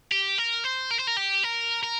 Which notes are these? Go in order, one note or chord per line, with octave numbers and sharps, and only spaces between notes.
G4
A#4
C5
A#4
C5
A#4
G4
A#4
A#4